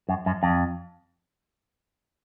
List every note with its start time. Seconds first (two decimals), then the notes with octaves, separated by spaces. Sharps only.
0.09 F#2
0.26 F#2
0.43 F2